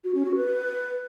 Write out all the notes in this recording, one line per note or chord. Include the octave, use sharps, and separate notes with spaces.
F#4
C#4
F#4
B4